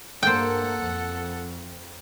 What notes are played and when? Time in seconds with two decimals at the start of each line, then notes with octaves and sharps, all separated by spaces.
0.23 G2 A#3 A4 C5 F#5 G5
0.80 F2